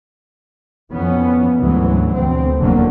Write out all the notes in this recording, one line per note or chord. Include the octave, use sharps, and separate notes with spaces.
F2 E3 B3 C#4
D2 G#2 E3 F#3
D2 B2 C4
F1 E2 D3 F#3 A#3